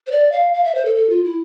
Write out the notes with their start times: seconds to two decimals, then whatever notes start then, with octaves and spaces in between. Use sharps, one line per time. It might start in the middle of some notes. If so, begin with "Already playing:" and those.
0.07 C5
0.11 D5
0.32 F5
0.53 F5
0.64 E5
0.75 C5
0.85 A4
0.95 A4
1.10 F4
1.24 E4